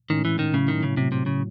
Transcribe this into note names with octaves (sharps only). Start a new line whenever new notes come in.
A2 D#3 G#3 C#4
E3
D#3
A2 C#3 F#3 C#4 E4
D#3
C#3
A2 C3 F#3 A3
C3
C#3